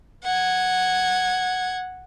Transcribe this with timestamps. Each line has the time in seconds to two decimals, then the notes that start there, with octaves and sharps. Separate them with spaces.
0.24 F#5 G#6